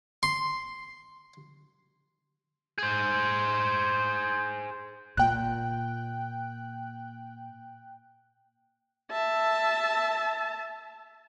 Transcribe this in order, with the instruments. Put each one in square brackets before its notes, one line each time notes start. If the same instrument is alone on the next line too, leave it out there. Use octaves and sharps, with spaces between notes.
[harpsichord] C6
[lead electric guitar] G#4 C5
[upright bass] A#2 [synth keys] G5 F#6
[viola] E5 A5